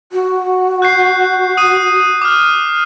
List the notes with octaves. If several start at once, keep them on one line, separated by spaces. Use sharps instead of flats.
F#4
F#6 G6 C7
D#6 D#7
D6 F6